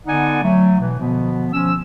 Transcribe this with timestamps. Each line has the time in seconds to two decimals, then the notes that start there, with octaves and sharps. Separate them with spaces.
0.06 D3 B3 D#4 D5 F#5 G#5
0.43 F#3 A3
0.80 B2 E3
1.00 B2 D3 F3 B3
1.53 F3 C#4 E6